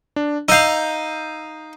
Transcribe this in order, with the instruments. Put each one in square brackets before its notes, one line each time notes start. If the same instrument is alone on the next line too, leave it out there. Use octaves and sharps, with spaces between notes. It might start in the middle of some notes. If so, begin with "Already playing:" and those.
[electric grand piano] D4
[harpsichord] D#4 F5 [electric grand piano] E6 G6